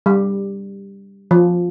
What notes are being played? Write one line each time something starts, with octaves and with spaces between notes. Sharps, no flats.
G3
F3